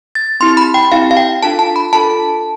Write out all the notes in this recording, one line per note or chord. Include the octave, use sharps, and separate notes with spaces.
A6
C4 E4 G4 C6
B5
G5
C4 E4 G4 F5
F5
G5
D4 F4 A4 A5
A5
B5
D4 F4 A4 A5